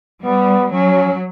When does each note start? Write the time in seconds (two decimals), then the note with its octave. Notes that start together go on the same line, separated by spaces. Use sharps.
0.24 G3 B3
0.72 F#3 C#4